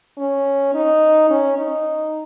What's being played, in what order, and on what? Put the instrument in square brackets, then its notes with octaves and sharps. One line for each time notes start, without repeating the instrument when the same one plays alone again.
[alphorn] C#4
D#4
C#4
D#4